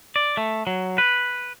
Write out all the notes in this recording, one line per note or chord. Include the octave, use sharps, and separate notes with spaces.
D5
A3
F#3
B4